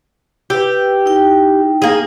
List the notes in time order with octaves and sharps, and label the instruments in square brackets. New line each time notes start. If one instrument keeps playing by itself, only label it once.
[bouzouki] G4 [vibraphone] B4 E6
[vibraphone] D#4 E4 G5
[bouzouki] A#3 G#4